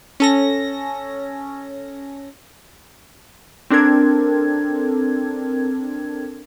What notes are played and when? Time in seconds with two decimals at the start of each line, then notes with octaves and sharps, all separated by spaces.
0.20 C#4 A4 A#6
3.70 C4 D4 A4 A#4 G#6